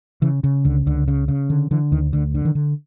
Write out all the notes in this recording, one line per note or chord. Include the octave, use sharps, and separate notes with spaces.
C#3 E3
C#3
C#2 D3
C#2 D3
C#3
C#3
D3
D3 E3
D2 D#3
D2 D3
D3
D#3
D3